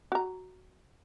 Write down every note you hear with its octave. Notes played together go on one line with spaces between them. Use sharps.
F#4 A#5